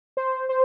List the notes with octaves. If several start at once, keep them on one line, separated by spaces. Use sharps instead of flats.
C5
C5